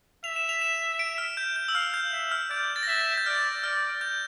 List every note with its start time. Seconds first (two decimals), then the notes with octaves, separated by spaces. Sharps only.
0.24 E5 F7
0.36 E7
0.49 F7
0.62 E7
0.99 D7
1.18 F6
1.37 G6
1.56 G6
1.68 E6
1.75 F5 F6
1.94 G6
2.12 E5
2.31 F6
2.50 D5 G6
2.76 A6
2.83 A#6
2.88 E5 A6
3.00 G6
3.17 G6
3.26 D5 F6
3.63 D5 F6
4.01 G6